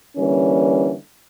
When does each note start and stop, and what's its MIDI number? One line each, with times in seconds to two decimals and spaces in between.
0.17 0.94 50
0.17 0.94 52
0.17 0.94 55
0.17 0.94 58
0.17 0.94 61